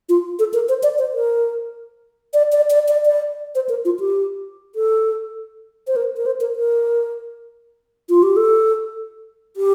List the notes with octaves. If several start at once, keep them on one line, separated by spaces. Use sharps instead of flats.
F4
A4
A#4
C5
D5
C5
A#4
D5
D5
D5
D5
D5
C5
A#4
F4
G4
A4
C5
A#4
A#4
C5
A#4
A#4
F4
G4
A4
G4